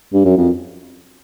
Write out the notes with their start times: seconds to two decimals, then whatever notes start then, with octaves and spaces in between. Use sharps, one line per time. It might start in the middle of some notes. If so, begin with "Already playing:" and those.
0.13 G2
0.25 F#2
0.37 F2